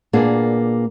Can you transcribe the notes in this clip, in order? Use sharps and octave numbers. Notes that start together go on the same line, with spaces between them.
A#2 A#3 B3 D4 G#4 D5